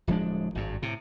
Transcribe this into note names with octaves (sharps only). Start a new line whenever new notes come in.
D1 F3 G#3 D4
G#1 G2
A2 C3